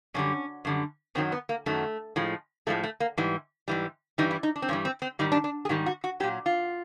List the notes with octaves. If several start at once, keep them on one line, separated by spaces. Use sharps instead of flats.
F#2 D3 G3 C#4
F#2 D3 G3
F#2 D#3 F#3 C4
B3
A#3
F#2 D#3 F#3 A3
A2 F3 G#3
A2 F3 G#3 A3
A3
A#3
G#2 E3 G3
G#2 E3 G3
G2 E3 G3 D#4
E4
D#4
D4
C4
G2 E3 G3 C#4
C4
C4
G#2 D#3 G3 D#4
D4
D4
G#4
G#2 D#3 G3 G4
F#4
F#4
A#2 F#3 G4
F4